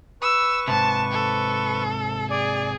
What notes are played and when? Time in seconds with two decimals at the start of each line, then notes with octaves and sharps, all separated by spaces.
0.22 B4 C#6 E6
0.68 G#2 C3 A5
1.12 A4
2.30 G#4 D5